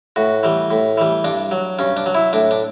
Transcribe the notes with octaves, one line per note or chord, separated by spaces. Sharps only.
A2 F#4
E3 G3
A2
E3 G3
G2 D4
F#3
G2 C#4
D4
F#3
E4
A2 D4
D4